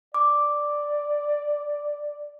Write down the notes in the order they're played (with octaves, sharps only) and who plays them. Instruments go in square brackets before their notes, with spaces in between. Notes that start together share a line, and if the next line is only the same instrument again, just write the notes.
[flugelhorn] D5 [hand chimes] D6